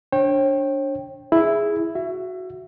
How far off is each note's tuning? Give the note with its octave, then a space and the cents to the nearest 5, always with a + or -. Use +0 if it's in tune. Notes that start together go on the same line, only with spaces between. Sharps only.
D4 -10 C#5 -40 G5 +0
E4 +0 G#4 +0
F#4 +0 E5 +25